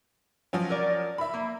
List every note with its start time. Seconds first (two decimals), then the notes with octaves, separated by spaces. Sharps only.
0.53 F3 F#3 C#4
0.70 A#4 D5
1.18 E5 B5
1.34 A#3